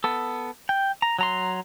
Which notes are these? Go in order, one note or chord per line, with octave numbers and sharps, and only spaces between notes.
B3 A4
G5
A#5
F#3 A#5 C6